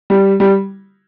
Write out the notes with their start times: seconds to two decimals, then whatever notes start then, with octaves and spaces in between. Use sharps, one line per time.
0.10 G3
0.40 G3